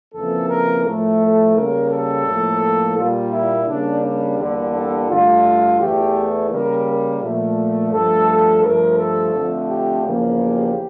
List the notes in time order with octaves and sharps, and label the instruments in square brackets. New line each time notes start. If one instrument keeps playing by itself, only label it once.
[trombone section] F2 C#3 E3 A#3 A4
A#4
A2 F3 A3
A4
C#3 G3 A#3 A#4
A4
A2 F3 A#3
A#2 G3 A#3 F4
E4
C#3 G3 A#3 D4
D4
E2 D3 G3 A#3
A4
G2 D3 A3 F4
E2 E3 A3 G4
C#3 G3 A#3 A#4
A#4
A#2 F3 A3
G2 F3 A3 A4
G2 F3 A3 A#4
A4
F2 D3 F3 A3
G4
E2 C#3 F3 A#3
G4